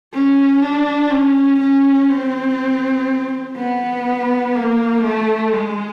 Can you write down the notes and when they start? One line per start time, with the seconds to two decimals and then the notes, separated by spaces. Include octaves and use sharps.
0.13 C#4
0.62 D4
1.11 C#4
1.60 C#4
2.09 C4
3.56 B3
4.55 A#3
5.04 A3
5.53 G#3